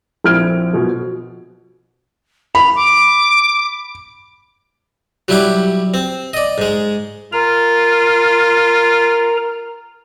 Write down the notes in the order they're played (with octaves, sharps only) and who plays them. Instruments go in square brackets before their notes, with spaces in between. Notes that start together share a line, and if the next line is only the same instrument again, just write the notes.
[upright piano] A#1 C4 E4 F6 G#6 D7
A#1 B2 F3
[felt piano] B5 [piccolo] F7
[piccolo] D6
[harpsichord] F#3 G3 E4 G4 F#5 D6
C4
D5 D#5
G#2 G#3
[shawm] F4 [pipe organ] A#4 A#5